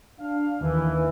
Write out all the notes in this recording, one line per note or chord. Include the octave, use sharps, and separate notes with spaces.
D4 F5
D#2 E3